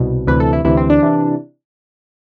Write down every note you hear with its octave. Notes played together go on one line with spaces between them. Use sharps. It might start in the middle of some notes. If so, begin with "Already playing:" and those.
Already playing: C2 B2
D2 C3 E3 B4
A4
E4
D2 C3 E3 E4
C4
D4
C3 E3